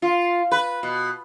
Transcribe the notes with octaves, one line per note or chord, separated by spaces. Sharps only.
F4
B4
B2